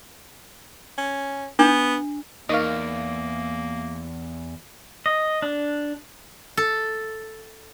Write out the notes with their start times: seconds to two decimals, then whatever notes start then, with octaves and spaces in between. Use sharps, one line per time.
0.98 C#4
1.59 B3 D4
2.49 E2 A#3 D#4 A#4 D#5 F5 C#6
5.06 D#5
5.42 D4
6.57 A4